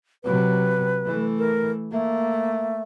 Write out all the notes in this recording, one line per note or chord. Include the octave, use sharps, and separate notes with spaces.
C3 F#3 B4
E3 A3
A#4
A3 A#3